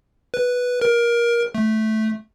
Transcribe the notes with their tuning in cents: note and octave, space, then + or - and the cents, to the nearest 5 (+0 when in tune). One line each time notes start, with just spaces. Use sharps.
B4 -5
A#4 +20
A3 -10